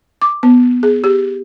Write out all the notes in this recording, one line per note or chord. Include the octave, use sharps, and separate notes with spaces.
D6
B3
G#4
G4